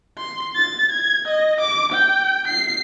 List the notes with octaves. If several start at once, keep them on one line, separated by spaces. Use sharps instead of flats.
C6
A6
G#6
D#5
D6
G5
C7